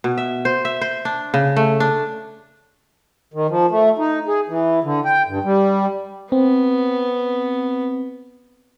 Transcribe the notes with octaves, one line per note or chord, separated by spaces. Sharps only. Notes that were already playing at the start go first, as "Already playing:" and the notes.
B2
E5
C5
E5
C5
D4
C#3
A3
D4
D#3
F3
A3
D#4
G#4
E3
D3
G5
G2
G3
B3 C4